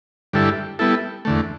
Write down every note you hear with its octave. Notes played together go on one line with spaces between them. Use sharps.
G2 D3 G3 E4 A4
G3 B3 E4 A4
E2 D3 A3